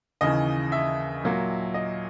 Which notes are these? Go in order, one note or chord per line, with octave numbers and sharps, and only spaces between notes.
D#2 C#3 E3 D#5
E5
A#2 F#3 A#3
D#5